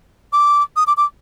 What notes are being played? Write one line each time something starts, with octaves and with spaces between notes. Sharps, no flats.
D6
D#6
D6
D6